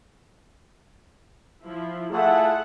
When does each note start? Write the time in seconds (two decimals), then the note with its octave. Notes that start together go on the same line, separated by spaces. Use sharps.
1.64 F3 E4
2.13 A3 E4 F4 G#4 A4 F#5